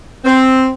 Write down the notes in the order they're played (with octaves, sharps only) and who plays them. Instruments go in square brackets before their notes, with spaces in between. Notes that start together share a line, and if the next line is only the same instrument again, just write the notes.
[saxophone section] C4